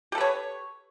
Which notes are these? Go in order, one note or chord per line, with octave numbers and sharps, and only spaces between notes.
G4 A4 B4 C#5